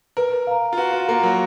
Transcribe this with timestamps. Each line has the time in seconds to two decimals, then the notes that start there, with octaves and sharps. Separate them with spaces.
0.17 A#4 B4
0.47 F5 A#5
0.73 F4
0.77 F#4 B4
0.93 F4
1.08 A#3 A#5
1.12 F5
1.23 F#3